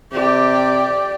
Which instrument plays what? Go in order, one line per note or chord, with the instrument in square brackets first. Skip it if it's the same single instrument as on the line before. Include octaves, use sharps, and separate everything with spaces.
[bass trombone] C3 [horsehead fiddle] G4 D5